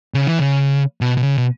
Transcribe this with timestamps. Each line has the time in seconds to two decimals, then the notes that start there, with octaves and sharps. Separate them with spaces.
0.14 C#3
0.27 E3
0.39 C#3
1.01 B2
1.17 B2
1.22 C#3
1.38 B2